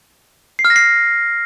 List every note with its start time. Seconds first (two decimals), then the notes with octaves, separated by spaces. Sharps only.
0.59 C7
0.65 F6
0.70 A#6
0.76 C7